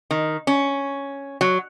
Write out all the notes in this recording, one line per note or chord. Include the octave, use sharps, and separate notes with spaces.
D#3
C#4
F#3